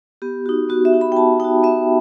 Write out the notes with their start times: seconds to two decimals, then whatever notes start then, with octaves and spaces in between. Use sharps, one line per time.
0.22 B3 G4
0.46 D#4 F#4
0.69 B3 F#4
0.85 E5
0.93 D#4 F#4
1.01 B5
1.12 G5
1.17 B3 A5
1.40 D#4 F#4 G5
1.63 B3 E5